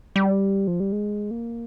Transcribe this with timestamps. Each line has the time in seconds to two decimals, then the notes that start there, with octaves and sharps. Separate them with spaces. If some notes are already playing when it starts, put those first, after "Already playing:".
0.16 G3
0.67 F3
0.80 G3
0.92 G#3
1.31 A#3